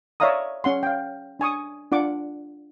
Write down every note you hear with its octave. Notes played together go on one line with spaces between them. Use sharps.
C#5 D5 E5 F5 A#5 D#6
C#4 F#5 C6
F5 G5
D4 G#5 C#6 D#6
D4 F4 F#5 D6